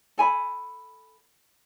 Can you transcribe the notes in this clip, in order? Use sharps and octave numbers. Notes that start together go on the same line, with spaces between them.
A4 G#5 B5